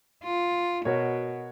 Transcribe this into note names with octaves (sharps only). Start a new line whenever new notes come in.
F4
B2 F#4 A#4 C#5